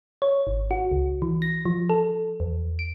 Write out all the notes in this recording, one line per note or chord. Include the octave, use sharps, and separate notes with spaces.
C#5
G#1
F#4
C#2
E3
A#6
F3
A4
E2
D7